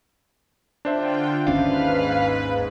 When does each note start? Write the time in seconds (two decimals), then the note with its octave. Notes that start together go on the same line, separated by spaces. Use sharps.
0.85 D3 D4 F4 C5 E5 G5
1.47 G#1 D#2 G#2 C#4 B4 F5